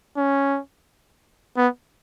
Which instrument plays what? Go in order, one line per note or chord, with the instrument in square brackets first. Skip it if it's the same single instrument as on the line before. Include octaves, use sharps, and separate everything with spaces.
[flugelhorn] C#4
B3